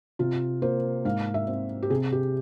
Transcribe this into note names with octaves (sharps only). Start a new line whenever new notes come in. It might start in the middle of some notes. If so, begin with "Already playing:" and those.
C3 F4
A#3 C5
G#2 F5
E5
C4
G4
C3 G#4
G4